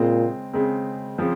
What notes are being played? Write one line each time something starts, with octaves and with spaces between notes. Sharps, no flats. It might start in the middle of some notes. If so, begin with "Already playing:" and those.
Already playing: A#2 C#3 G#3 C4
C#3 G#3 C4
C#3 F3 C4